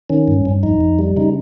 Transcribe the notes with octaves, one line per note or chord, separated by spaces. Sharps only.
D#3 C#4
G2
G2
F2 D#4
F2
G3
C#3 D#4